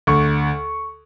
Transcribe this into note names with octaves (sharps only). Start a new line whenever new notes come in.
D2 C#6